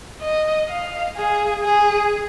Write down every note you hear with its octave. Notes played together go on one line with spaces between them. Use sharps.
D#5
F5
G#4
G#4